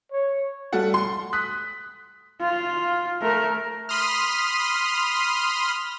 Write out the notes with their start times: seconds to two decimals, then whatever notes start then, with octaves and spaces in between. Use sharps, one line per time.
0.12 C#5
0.73 G3 A3 F#4 A4 F#5
0.94 C6
1.33 D#6 F#6 B6
2.41 F4
3.21 A3 A#4
3.89 B5 C6 D#6 F6